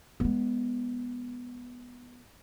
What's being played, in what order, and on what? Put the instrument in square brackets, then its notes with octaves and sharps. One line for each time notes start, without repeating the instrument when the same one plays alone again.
[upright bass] G#3 B3